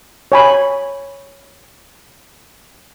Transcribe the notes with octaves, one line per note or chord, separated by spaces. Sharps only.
C#5 G#5 B5